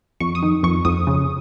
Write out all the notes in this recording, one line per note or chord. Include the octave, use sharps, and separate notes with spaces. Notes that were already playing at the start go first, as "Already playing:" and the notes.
F2 C#6
D#6
D#3
F2 C#6
F2 D#6
C#3